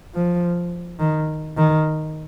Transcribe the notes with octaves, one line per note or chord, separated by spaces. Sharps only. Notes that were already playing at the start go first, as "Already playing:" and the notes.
F3
D#3
D#3